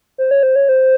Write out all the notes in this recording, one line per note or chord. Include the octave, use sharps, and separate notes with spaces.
C5
C#5
C5
C#5
C5